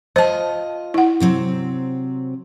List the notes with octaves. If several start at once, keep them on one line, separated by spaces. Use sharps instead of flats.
F4 C5 D#5 A5
E4 F#5
C3 F#3 C4